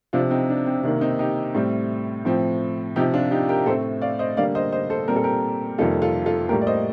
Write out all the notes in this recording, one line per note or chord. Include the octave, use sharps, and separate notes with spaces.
C3 F3 C4 D4 F4
C4 D#4
D4
C4
C3 D#3 A#3 D4
C4 D#4
D#4 G4
A2 G3 C4
A2 F3 C4
C3 F3 C4 D#4 G4
D4 F4
D#4 G4
G4 A#4
A2 A3 C4 A4 C5
D5 F5
C5 D#5
D3 G3 A#3 D5 F5
C5 D#5
C5 D#5
A4 C5
A#2 G3 C4 A#4
A4
G4 A#4
F2 C3 D#3 G3 A#3 F4 A4
F4 A4
F4 A4
A2 G3 A#3 G4 A#4
D5
C5 D#5